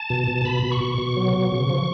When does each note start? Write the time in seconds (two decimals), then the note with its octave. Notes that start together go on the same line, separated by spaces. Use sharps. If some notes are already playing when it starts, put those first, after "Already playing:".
Already playing: A5
0.10 B2
0.27 B2
0.45 B2 B5
0.63 B2
0.71 C#6
0.81 B2
0.98 B2
1.16 F#3
1.34 B2
1.52 C#3
1.69 F3